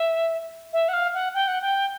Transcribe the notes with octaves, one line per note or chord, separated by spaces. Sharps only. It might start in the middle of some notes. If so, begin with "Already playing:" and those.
Already playing: E5
E5
F#5
F5
F#5
G5
F#5
G5